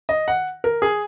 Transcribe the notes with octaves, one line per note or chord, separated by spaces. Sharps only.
D#5
F#5
A#4
G#4